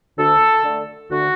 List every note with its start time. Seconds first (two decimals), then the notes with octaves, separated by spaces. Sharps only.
0.17 D2 A4
0.64 D3 A3
1.10 D2 F#4